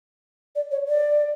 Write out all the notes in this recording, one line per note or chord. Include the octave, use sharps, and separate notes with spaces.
D5
C#5
D5